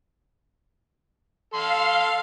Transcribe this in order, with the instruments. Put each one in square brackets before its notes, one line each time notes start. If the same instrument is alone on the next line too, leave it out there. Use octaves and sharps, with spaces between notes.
[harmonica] A4 C6 [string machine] F5